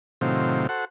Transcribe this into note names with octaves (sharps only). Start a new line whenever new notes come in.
A2 C3 D#3 F#3 C4 F4
F#4 A4 C5 F#5